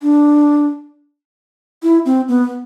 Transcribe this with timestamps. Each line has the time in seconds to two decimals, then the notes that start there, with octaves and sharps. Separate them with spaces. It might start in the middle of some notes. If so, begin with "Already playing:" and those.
0.02 D4
1.83 E4
2.06 C4
2.28 B3